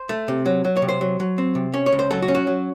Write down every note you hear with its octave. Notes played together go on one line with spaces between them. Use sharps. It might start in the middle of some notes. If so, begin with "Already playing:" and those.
Already playing: C5
A3
C3
F#3
F#3
C#5
C3
C5
F#3
F#3
C4
C3
C#4 C#5
C#5
C#2
C5
F#3 A4
F#4
C#4
F#4
F#3